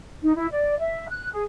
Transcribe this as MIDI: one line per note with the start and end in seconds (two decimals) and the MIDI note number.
0.21 0.32 63
0.35 0.45 64
0.50 0.76 74
0.79 1.07 76
1.09 1.28 90
1.32 1.42 68